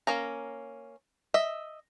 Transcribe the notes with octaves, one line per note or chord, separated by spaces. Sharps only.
A#3 C#4 A#5
D#5 E5